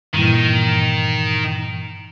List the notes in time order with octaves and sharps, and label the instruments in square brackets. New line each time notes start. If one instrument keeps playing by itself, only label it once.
[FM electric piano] G2 A#2 E3 [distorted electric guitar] D#3